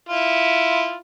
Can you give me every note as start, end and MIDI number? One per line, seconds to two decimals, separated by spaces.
0.09 0.96 64
0.09 0.96 65